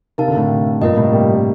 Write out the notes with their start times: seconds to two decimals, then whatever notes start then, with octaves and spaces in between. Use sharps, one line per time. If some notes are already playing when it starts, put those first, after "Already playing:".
0.18 C3 D#4 A#4 F5 A5
0.28 D3
0.37 A2 C3
0.81 G2 A#2 F4 A#4 D#5
0.97 A2 C3
1.13 G3 A#3